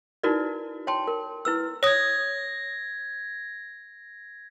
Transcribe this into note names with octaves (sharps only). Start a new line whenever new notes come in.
D#4 E4 F#4 A#4 B4 D5
C#5 G5 A5 C6
A#4
E4 B4 E6
C#5 D#6 G#6 A#6